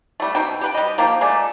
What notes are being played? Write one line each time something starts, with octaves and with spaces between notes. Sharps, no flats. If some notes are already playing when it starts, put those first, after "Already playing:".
G3 A3
B2 D#4 C5 G5
G4 B4 G5
G3 D#5
F3 A#3 D#4 G4
G#3 A3 D5